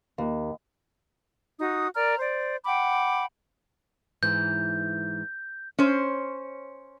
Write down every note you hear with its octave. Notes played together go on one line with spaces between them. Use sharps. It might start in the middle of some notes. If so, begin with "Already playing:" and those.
D#2
D#4 F#4 D#6
A#4 D5 A#5 F6
C5 D5
F#5 G5 B5 D6
G#2 E3 G6
C#4 C5